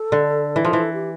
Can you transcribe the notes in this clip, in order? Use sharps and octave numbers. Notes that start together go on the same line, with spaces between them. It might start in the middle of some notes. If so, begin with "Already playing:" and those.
Already playing: A4
D3
E3
F3
E3 A4
G4